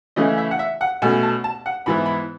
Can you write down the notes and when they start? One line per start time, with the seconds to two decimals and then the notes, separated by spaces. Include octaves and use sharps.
0.16 C#3 E3 A3 C#4 E4 D#5
0.38 E5
0.51 F#5
0.59 E5
0.81 F#5
1.02 B2 A3 C#4 G#5
1.23 A5
1.44 A5
1.66 F#5
1.86 G#2 E3 B3 E4 B5
2.06 B5